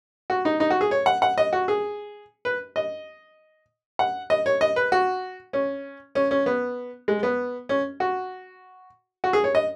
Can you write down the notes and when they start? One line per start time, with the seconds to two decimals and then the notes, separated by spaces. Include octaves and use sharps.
0.30 F#4
0.45 D#4
0.60 D#4
0.70 F#4
0.81 G#4
0.91 C#5
1.06 F#5
1.22 F#5
1.38 D#5
1.53 F#4
1.68 G#4
2.45 B4
2.76 D#5
3.99 F#5
4.30 D#5
4.46 C#5
4.61 D#5
4.76 B4
4.92 F#4
5.53 C#4
6.15 C#4
6.31 C#4
6.46 B3
7.08 G#3
7.23 B3
7.69 C#4
8.00 F#4
9.24 F#4
9.33 G#4
9.44 C#5
9.55 D#5